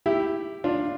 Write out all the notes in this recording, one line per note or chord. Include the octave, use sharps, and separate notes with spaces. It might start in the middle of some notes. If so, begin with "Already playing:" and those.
E4 G4
D4 F4